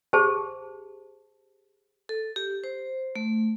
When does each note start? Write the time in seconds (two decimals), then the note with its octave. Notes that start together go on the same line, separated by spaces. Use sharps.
0.13 G4 G#4 C5 A5
2.09 A4
2.36 G4
2.64 C5
3.16 A3